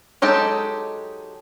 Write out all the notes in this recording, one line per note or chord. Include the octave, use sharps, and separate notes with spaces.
F#3 G#3 D#4 G4 A4